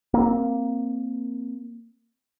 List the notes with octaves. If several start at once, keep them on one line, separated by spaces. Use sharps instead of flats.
A#3 C4